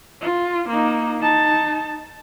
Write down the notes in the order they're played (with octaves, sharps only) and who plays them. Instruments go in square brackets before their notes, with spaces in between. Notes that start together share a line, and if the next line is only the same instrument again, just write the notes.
[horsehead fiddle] F4
A#3 D#4
D#4 A5